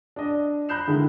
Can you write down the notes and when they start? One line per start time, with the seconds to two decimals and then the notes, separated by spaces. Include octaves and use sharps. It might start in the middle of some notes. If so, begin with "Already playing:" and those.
0.16 D4 D#5
0.69 A#5 B5 F#6 G6 C7 E7
0.87 D3 D#3 G#3 E4